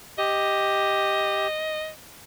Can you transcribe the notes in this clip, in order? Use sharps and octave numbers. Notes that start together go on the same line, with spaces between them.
G4 D#5